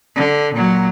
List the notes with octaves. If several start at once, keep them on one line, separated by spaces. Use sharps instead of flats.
D3
A#2 F#3